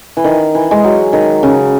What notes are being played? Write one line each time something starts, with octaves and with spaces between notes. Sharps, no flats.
E3
D#3
E3
G#3
F#3
D#3
C#3